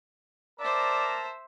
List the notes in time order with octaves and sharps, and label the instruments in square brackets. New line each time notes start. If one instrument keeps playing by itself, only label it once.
[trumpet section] A#4 A5 A#5 [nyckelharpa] C5 E5 [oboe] D5